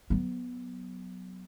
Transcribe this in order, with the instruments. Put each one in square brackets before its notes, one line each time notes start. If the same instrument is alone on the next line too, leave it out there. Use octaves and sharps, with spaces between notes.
[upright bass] F#3 B3